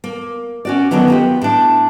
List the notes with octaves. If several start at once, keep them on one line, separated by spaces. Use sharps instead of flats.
A#3
C#4 F#4 D5
D3 D#3 F3 F#3 B3
B3 F4 G4
A2 D4